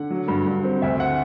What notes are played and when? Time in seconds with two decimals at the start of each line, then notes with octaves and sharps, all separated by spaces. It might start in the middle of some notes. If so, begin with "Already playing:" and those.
Already playing: D3 F#5
0.10 F#3
0.28 G2
0.47 G2
0.63 C4
0.82 D2 E5
1.00 F#5